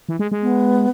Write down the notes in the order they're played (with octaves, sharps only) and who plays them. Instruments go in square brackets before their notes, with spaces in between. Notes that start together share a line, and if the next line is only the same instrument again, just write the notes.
[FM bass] E3
G#3
G#3
[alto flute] B3